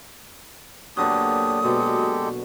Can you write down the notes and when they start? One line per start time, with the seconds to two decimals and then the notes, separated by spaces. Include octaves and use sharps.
0.97 A#2 D3 F#3 B3 D4 G4 D#6
1.64 B2 G#3 B3 G4 A4